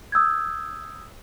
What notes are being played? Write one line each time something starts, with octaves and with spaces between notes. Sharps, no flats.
D#6 E6 G6 G#6